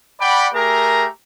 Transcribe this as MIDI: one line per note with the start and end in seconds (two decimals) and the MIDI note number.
0.20 0.47 74
0.20 0.47 78
0.20 0.47 79
0.20 0.47 83
0.54 1.07 57
0.54 1.07 67
0.54 1.07 68
0.54 1.07 70
0.54 1.07 82